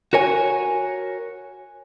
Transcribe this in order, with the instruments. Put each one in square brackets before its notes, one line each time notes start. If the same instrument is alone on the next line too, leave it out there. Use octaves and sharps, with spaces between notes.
[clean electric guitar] F#4 A#4 C#5 G#5